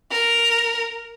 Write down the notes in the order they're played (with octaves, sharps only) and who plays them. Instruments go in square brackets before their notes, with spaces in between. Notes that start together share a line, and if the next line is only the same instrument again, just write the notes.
[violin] A#4